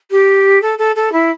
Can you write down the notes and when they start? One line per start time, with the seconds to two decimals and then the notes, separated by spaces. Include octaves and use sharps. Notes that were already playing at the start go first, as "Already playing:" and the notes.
0.10 G4
0.61 A4
0.78 A4
0.95 A4
1.12 E4